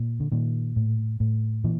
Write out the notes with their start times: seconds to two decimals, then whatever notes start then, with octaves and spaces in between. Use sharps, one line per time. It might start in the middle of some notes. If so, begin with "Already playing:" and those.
Already playing: A#2
0.20 D3
0.32 A#2 D#3
0.76 A2
1.20 A2
1.64 A#2 E3